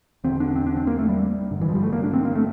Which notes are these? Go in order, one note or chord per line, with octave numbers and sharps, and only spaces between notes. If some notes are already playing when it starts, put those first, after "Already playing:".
E2 D3 C4
D4
C4
D4
C4
A#3
A3
G3
G2 D3
E3
F3
G3
A3
A#3
D4
C4
A#3
A3